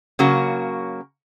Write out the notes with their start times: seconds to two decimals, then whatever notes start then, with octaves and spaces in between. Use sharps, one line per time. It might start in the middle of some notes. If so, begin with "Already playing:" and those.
0.19 C#3 F#3 A#3 F#4